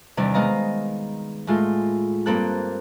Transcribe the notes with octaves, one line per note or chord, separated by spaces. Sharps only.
E2 C3 D#3 G3 D4
G#3 B3 D#5 F5 A#5
A2 G#3 F4 A4
G2 A#3 C4 A4 F#6